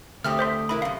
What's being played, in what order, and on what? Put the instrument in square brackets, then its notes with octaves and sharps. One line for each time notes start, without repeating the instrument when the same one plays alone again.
[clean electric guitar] D2 [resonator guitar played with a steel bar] A3 C4 G4 [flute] D#6 [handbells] F6
[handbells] C5 E5 C6
[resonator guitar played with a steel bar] C3 E4 A#4 [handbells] B5
[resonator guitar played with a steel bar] F#2 C3 [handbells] F5